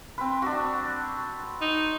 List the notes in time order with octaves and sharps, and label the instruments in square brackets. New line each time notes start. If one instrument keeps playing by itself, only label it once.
[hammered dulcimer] C4 B4
D4 F#4
[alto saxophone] D#4